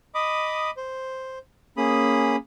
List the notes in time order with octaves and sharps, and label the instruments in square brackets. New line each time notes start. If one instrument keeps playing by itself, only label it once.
[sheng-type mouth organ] D#5 B5 D6 D#6
C5
A#3 C#4 G#4 B5 D#6